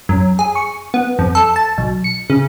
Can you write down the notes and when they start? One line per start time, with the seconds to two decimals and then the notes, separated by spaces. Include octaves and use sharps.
0.09 F#2
0.39 G#4
0.55 C#6
0.94 B3
1.19 F2
1.35 A4
1.56 A5
1.78 B1
2.04 C#7
2.30 C#3